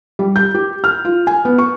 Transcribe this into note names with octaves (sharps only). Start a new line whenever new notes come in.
G3
G6
G4
F6
F4
G#5
B3
C#6